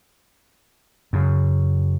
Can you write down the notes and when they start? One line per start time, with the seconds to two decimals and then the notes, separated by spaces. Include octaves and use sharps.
1.13 F#2 C#3